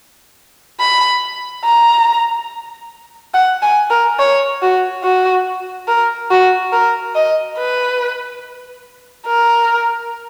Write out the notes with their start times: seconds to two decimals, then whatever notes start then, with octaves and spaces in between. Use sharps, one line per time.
0.80 B5
1.65 A#5
3.34 F#5
3.62 G#5
3.90 A#4
4.19 C#5
4.62 F#4
5.03 F#4
5.88 A#4
6.30 F#4
6.73 A#4
7.15 D#5
7.58 B4
9.27 A#4